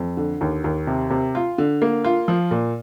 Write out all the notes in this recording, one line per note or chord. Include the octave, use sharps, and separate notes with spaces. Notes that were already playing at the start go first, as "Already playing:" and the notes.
Already playing: F2
D3
D#2
D#2
C3
C3
F4
D3
A#3
F4
F3
A#2